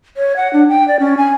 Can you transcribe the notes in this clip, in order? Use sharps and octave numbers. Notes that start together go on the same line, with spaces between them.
C#5
F#5
D4
G5
D5
C#4
G#5